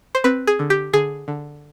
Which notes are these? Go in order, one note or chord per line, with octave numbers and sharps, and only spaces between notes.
C5
C4 B4
G#4
D3
G4
D3 G#4
D3